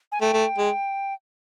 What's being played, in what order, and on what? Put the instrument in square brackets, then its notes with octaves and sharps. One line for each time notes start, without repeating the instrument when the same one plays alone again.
[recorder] G#5
[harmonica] A3 [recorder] G5
[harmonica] A3
G#3